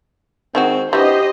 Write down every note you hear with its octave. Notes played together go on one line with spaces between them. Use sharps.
D#3 G#3 C4 F#4
E3 D4 F#4 G4 C5 D#5